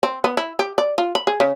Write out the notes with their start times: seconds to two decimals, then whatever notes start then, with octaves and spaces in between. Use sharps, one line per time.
0.03 C4
0.24 B3
0.37 E4
0.59 G4
0.78 D5
0.98 F4
1.15 B5
1.27 G#4
1.40 C#3